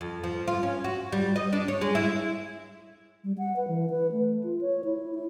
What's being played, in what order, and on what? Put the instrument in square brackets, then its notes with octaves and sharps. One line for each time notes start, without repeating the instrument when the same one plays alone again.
[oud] F2
F3
F4
C#4
F#4
G3
D#5
D4
C#5
G#3
E4
[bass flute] G3
F#5
B4
E3
B4
A3
F4
C#5
E4
E4